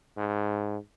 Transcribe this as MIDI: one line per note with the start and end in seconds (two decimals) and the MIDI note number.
0.17 0.78 44